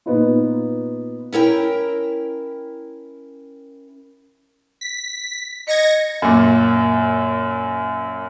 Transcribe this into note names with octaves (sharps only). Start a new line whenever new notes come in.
A#2 B3 D#4 F4
C#4 E4 A#4 G5
B6
D#5 G#6 A#6 C#7
F#2 A#2